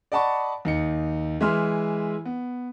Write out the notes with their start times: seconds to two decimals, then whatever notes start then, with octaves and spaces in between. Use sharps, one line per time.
0.12 D5 D#5 F#5 A5 B5 C#6
0.65 D#2 D#4 C#7
1.41 E3 G#3 E4 E5 C6 F6
2.25 B3